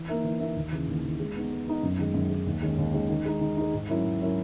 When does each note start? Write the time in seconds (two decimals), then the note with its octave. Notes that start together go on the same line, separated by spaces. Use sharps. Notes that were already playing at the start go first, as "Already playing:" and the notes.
Already playing: E3
0.08 A#3 D#4 A#4 E5
0.24 E3
0.40 A#3 D#4 A#4 E5
0.56 D#2
0.72 C#3 E3
0.88 D#2
1.04 C#3 E3
1.20 G#3
1.36 B3 D#4
1.51 G#3
1.67 B3 D#4
1.83 F#2
1.99 D#3 G#3
2.14 F#2
2.30 D#3 G#3
2.46 D#2
2.62 D#3 G#3 C#4
2.78 D#2
2.94 D#3 G#3 C#4
3.09 D#3
3.26 G#3 D#4
3.41 D#3
3.57 G#3 D#4
3.73 G#2
3.89 F#3 C#4 E4 A#4
4.05 G#2
4.21 F#3 C#4 E4 A#4